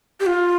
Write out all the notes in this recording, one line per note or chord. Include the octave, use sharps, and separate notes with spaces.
G4
F4